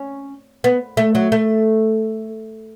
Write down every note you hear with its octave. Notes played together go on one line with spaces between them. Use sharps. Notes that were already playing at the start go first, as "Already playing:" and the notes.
Already playing: C#4
B3
A3
F#3
A3